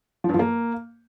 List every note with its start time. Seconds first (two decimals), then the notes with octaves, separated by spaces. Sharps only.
0.24 F3
0.29 G2
0.34 F3
0.39 A#3